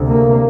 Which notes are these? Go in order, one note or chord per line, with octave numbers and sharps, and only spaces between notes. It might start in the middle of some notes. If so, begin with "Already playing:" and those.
Already playing: D2 C3
A#3